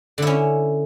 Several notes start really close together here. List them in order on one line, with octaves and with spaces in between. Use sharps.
D3 E4 C#4